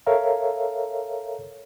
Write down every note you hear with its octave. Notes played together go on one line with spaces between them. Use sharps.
A4 A#4 C#5 E5 F5 A#5